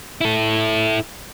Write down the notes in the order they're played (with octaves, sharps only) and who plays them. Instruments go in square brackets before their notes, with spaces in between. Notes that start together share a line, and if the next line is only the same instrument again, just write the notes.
[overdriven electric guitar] E4 A4